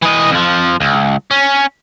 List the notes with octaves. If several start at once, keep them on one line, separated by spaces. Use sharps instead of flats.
E3 D#5
F2 F3
C#2
C#4